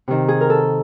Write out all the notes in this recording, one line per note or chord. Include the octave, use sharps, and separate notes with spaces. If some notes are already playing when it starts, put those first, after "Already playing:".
C3 D#3
G#4
A#4
A4